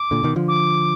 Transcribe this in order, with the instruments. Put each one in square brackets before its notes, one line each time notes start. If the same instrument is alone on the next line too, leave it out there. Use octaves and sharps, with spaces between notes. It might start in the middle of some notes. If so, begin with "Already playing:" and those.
Already playing: [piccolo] D6
[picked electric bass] A#2 D3
B2 D#3
D3 F3
[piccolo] D6